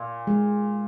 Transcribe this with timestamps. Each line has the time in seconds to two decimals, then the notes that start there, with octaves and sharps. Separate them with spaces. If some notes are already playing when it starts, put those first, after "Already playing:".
Already playing: A#2
0.27 G#3